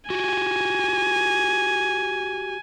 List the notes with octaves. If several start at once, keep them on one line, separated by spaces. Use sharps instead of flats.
F#4 G4 G#5